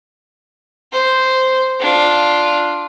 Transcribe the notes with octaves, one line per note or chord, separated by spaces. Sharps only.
C5
D4 F4